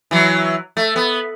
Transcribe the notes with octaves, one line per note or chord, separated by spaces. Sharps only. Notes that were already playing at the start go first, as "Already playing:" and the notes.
E3 F#3
A3
B3